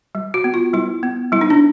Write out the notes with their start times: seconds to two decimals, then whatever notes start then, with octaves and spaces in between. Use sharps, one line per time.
0.15 G3
0.34 F#4
0.44 B3
0.54 F4
0.74 G3 E4
1.03 B3
1.32 G3 E4
1.41 D#4
1.50 D4